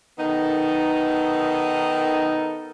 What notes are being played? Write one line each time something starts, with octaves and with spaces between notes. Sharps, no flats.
D#3 B3 D#4 A4 A#4